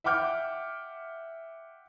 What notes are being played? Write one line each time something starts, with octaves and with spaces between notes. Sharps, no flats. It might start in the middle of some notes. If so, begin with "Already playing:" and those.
E5 F#5 G5 D6 F6 G6